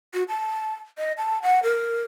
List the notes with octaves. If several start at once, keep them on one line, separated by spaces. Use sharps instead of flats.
F#4
A5
D#5
A5
F#5
A#4